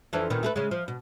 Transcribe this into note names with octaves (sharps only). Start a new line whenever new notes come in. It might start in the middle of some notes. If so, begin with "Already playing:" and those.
F2 E3 D4
A#2 D#3 B3
A3 G4 B4
C#3 G#3
F3
B2